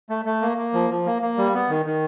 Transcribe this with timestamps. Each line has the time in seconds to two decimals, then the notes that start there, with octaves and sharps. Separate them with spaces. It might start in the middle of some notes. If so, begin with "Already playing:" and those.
0.10 A3
0.25 A3
0.42 A#3
0.58 A#3
0.73 F3
0.90 F3
1.06 A#3
1.22 A#3
1.37 G3
1.54 B3
1.69 D#3
1.85 D#3